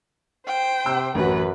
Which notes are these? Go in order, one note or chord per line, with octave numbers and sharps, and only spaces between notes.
C5 G5
C3 E6
A1 F#2 F#4 B4